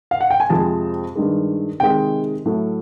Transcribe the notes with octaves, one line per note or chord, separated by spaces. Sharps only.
F5
F#5
G5
G#5
F2 C3 F3 G#3 A5
G2 D#3 G#3
C3 D#3 G#3 G5
A2 F#3 A3